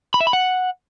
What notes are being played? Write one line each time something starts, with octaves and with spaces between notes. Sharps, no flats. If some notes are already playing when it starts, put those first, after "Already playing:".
B5
E5
B5
F#5